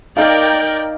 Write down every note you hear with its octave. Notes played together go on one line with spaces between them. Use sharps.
D#4 A#4 D5 F5 G5